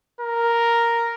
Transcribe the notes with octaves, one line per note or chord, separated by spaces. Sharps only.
A#4